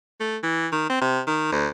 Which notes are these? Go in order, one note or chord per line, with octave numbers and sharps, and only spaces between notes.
A3
E3
D#3
C4
C3
D#3
D2